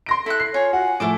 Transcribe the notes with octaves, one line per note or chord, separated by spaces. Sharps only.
C6 A#6 D7
E4 A4 F#6
C7
F4 C#5 G#5
F#4 F#5
A2 F3 A3 E4 A4 D6